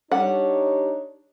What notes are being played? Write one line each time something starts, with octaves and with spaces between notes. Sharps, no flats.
G3 D4 D#4 C#5 F#5